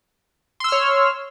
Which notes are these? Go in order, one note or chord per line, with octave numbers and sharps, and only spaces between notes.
C#5 C6 E6 F6